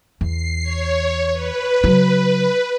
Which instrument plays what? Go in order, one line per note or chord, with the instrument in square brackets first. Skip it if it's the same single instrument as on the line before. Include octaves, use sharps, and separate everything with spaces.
[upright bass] E2 [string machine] C7
[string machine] C#5
B4
[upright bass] C#3 F#3